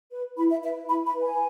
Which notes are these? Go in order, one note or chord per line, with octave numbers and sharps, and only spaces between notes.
B4
E4 B5
E5
B4 E5
E4 B5
B5
B4
G#5